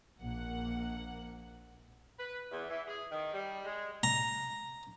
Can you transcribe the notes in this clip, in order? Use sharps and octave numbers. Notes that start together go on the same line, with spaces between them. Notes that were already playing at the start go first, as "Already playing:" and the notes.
A#1 A#3 F#5
B4
E2
E3
G#4
D#3
G3
G#3
A#5